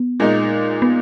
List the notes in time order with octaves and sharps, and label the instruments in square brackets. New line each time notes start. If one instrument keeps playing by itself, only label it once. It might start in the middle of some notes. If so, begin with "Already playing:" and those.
Already playing: [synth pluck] B3
[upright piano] A#2 G#3 D#4
[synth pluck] B3